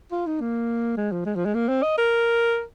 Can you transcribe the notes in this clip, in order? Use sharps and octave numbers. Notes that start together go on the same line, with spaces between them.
F4
D#4
A#3
G#3
F3
G#3
F3
G#3
A#3
C4
D#5
A#4